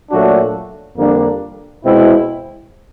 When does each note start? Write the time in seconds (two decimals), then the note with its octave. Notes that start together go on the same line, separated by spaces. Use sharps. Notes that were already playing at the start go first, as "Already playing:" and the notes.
0.11 A#2 F#3 A3 D4 F#4
0.97 F2 D3 G3 A#3 D4
1.83 B2 G#3 C4 E4